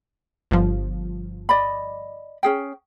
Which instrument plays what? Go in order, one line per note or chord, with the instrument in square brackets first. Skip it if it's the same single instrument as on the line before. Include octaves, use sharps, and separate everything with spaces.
[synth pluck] G1 F3
[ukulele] D5 D#5 B5
C#4 G#4 G5